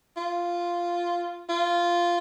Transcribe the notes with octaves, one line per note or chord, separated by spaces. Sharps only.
F4
F4